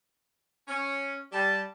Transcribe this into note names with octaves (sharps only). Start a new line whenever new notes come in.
C#4
G3 A5